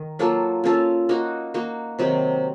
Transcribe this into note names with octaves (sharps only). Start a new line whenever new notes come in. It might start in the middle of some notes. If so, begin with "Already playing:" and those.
Already playing: D#3
F#3 A#3 F4 A4
A#3 C#4 F4 A4
A#3 D#4 F#4
A#3 D#4 F#4
C3 D#3 F#3 C4